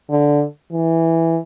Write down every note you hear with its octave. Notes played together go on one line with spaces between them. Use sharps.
D3
E3